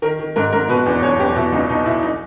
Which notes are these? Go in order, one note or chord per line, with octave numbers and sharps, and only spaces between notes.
D#3 A#4
D#3
G#2 A#4
G#2 A#4
B2 B4
E2
E2 C#5
E2 G4
B2 E4
C#2 D#4
B2 D#4
B2 E4
D#4